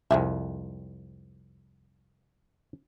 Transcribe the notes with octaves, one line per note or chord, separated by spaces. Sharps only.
C2 F2 D#3 G#3 E5